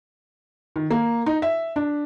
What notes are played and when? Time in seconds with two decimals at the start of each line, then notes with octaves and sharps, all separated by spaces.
0.76 D#3
0.90 A#3
1.26 D#4
1.42 E5
1.76 D4